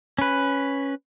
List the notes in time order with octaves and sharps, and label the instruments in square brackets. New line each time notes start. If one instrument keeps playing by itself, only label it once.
[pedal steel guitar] C#4 B4